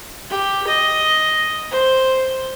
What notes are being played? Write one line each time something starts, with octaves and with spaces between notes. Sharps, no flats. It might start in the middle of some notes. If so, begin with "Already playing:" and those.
G4
D#5
C5